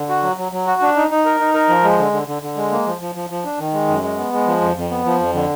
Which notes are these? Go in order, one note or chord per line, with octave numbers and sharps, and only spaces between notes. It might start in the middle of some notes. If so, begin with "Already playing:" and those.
Already playing: D3
F#4
F#3
F#3
F#3
F#4
D4
D#4
D#4
A#4
D#4
A#4
F3
G#3
D3
D3
D3
D3
G#3
A#3
F3
F3
F3
F3
D4
D#3
G#3
F#2
G#3
B3
G#3
F3
F2
F2
B3
F3
F2
D3